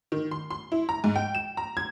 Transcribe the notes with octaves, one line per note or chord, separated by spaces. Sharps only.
D#3
C6
C6
E4
A#5
G#2
G5
E7
A#5
G#6